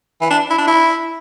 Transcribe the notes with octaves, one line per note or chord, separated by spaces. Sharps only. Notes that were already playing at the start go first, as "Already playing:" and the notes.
E3
D4
E4
D4
E4